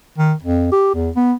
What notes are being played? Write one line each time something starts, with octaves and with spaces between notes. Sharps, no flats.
D#3
F2
G4
E2
B3